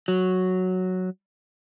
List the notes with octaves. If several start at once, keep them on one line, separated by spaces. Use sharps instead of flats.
F#3